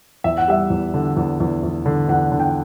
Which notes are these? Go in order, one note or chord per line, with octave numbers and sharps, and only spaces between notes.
E2 E5
F#5
G3 E5
E2
D3
E2
E2
E2
D3
E2 F#5
D3
G5